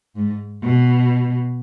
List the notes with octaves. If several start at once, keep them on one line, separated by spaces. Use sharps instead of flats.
G#2
B2